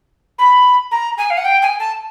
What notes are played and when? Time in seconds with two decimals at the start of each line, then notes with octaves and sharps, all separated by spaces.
0.39 B5
0.91 A#5
1.18 G#5
1.30 F5
1.37 F#5
1.45 G5
1.62 G#5
1.80 A5